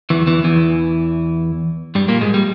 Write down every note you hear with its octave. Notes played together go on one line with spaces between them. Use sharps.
E2 E3
E2 E3
E2 E3
G2 G3
A#2 A#3
G#2 G#3
G3